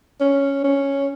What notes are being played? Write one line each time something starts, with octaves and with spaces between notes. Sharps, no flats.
C#4
C#4